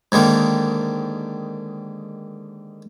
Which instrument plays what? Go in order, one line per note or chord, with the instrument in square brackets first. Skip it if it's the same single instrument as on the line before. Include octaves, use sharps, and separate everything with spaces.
[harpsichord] G#2 D3 D#3 A#3